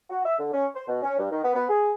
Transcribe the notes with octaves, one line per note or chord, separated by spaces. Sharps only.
F#4
E5
D3
C#4
C5
B2
C#4
G2
D#3
B3
B3
G#4